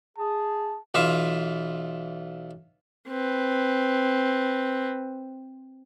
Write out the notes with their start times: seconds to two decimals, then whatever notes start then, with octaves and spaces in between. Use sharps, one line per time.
0.18 G#4 A5
0.94 B1 E3 F4 E5
3.09 C4 B4